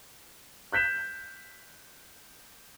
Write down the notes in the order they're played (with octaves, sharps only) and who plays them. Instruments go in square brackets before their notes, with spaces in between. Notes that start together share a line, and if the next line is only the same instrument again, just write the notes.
[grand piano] F#6 G6 B6 E7